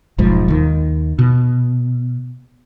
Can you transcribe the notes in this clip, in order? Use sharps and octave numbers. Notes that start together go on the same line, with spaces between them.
E1 B1 G#2 F3
D#2 D#3
B2